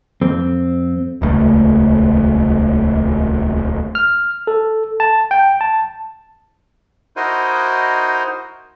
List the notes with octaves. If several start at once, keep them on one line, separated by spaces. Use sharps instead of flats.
F2 C4
D#1 C#2 A3
F6
A4
A5
G5
A5
D#4 E4 F#4 A#4 C5 D#5